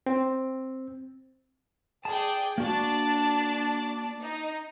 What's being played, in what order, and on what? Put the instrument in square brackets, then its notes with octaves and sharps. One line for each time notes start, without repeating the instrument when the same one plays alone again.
[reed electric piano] C4
[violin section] G#4 D5 G5 [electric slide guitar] A5
[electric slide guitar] A#3 F#4 [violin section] D4 D5 A5
[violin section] D#4